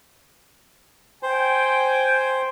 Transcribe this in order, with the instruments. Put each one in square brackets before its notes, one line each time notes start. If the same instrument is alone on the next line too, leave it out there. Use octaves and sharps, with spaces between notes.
[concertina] C5 [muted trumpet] G5 [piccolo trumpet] G#5